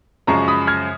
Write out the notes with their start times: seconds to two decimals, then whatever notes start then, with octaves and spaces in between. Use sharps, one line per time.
0.27 F#2 C#3 F3 G#3 A#5 C#6
0.48 B5 D#6
0.67 F6 G#6